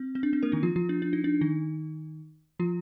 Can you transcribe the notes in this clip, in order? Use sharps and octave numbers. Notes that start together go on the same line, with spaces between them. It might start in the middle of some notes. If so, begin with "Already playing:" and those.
Already playing: C4
C4
D4
C4
A#3 A#4
D#3 D#4
F3 F4
F3 F4
D4
D4
D#4
D4
D#3 D#4
F3 F4